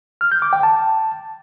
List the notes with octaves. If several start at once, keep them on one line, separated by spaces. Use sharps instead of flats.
F6
G6
D6
G5
A5